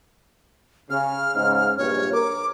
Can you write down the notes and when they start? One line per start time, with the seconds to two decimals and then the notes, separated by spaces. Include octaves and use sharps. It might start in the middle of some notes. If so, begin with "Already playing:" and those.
0.90 C#3 F6
1.36 G#2 C#3
1.78 A#1 G2 C#5
2.13 A#4 D6